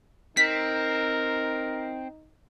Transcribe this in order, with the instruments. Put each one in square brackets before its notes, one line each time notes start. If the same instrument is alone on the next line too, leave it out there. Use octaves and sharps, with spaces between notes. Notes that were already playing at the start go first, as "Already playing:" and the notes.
[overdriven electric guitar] C4 [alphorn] D#4 [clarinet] A#4 [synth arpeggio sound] B6